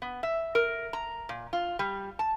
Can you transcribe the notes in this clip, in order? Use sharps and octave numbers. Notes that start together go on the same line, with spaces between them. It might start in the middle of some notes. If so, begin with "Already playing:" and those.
B3
E5
A#4
A#5
A#2
F4
G3
A5